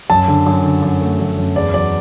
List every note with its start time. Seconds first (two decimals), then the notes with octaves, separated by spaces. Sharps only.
0.10 F#2 A5
0.28 D3
0.46 F#2
0.64 D3
0.82 F#2
1.01 A3
1.20 F#2
1.37 F#2
1.55 E2 D5
1.73 F#3 D5